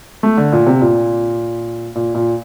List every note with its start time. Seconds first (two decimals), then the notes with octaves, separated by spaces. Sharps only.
0.23 A3
0.38 D3
0.52 A#2
0.67 C3
0.81 A#2
1.95 A#2
2.14 A#2